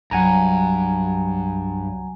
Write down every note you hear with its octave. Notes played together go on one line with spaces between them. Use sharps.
C2 G2 F#3 F#5 G#5 A#5